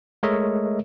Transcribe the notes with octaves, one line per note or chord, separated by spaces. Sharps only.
G#3 A3 A#4 C#5 D#5 E5